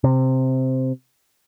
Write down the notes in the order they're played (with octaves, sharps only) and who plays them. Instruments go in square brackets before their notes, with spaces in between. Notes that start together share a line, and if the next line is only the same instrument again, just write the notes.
[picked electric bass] C3